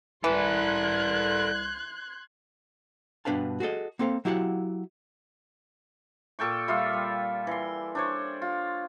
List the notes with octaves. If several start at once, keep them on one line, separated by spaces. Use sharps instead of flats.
C2 E3 A4 B4 C6 F#6 G#6
G2 B2 D4 B4 F5 A5
F#4 G#4 A4 D#5
A#3 C4 A4 F5
F#3 E4 G4 F5 F#5
A#2 A4 G5 C#6
G3 F4 E5 F5
G3
E3 C6
D4 C5 C#5
F4